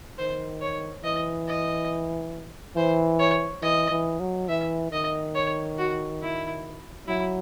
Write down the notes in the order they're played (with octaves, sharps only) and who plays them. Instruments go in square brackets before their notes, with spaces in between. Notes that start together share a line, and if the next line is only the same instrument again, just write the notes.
[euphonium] D#3 [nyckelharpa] C5
[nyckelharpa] C#5
[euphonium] E3 [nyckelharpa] D#5
[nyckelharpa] D#5
[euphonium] E3 [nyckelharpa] C5
[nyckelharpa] C#5
[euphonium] E3 [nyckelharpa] D#5
[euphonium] E3
F#3
[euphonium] E3 [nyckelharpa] E5
[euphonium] D#3 [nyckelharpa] D#5
[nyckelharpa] C#5
F#4
E4
[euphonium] F#3 [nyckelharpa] E4